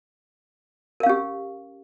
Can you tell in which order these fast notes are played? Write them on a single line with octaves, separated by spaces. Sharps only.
A#4 F5 C#4 G4